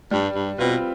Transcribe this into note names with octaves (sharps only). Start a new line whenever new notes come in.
G2 G3
G2
B2 C4 F4 B4